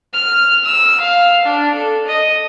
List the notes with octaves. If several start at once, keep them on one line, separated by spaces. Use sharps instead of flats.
F6
E6
F5
D4
A4
D#5